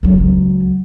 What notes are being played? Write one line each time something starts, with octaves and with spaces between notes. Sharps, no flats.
C#2 F#3